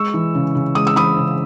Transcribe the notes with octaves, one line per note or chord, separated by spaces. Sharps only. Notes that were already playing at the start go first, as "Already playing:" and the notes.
Already playing: G#3 C#6 E6
E3
C#3
C#3
G#3 D#6
E6
E3 B5 D#6
C#3